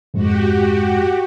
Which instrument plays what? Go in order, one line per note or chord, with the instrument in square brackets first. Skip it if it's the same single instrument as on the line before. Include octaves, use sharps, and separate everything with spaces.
[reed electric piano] F2 G#2 G#3 [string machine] F#4 G4